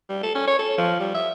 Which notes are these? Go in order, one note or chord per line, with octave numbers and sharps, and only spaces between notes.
G3
A4
C#4
C#5
A4
F3
G3
E5